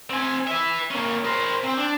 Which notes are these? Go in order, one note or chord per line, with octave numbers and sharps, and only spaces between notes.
C4 G#5
B4 E5
A#3 C#4
A#4 C5
C4
D4